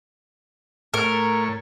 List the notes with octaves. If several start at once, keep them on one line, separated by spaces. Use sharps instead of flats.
A2 A#4 C#5